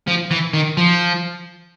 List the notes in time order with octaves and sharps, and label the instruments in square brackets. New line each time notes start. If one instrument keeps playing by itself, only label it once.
[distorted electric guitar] F3
E3
D#3
F3